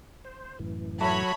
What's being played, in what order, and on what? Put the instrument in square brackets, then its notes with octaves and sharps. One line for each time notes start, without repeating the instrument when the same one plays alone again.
[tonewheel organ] C5
F#2 A2 E3
[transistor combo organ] F#3 [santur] A3 [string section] C#5 B5